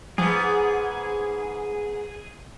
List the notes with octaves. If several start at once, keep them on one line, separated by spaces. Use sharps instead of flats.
G#2 F3 B3 G#4